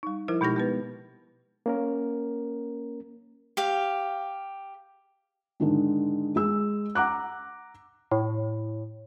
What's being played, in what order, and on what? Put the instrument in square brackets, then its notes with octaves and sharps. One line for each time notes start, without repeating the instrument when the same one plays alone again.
[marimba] G3 D#4
F3 E4 A#4 C5
B2 G#3 D#4 G4 A#6
G#3 B3 B4
[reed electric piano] A#3 C#4 A#4
[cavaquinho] G4 F5
[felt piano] G#2 D3 D#3 G#3
G#3 G#4 E6
F#5 A#5 D6 F#6
[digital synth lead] A2